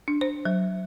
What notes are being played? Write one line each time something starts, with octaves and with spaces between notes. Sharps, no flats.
D4
C5
F#3